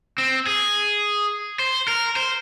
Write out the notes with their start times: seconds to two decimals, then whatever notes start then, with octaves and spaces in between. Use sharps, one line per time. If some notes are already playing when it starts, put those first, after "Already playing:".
0.18 C4
0.47 G#4
1.59 C5
1.88 A#4
2.16 C5